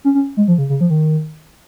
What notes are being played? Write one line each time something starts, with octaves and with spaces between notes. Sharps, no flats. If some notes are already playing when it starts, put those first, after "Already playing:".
C#4
C#4
G#3
F3
C#3
C#3
F3
D#3